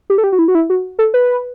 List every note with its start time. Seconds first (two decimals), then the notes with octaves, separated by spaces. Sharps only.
0.10 G4
0.18 A4
0.24 G4
0.32 F#4
0.39 E4
0.48 F#4
0.55 E4
0.70 F#4
0.99 A4
1.14 B4